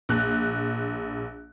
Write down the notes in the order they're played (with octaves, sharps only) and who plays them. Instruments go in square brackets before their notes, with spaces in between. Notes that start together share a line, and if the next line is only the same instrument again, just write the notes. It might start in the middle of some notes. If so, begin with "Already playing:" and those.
[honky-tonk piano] A#1 F#6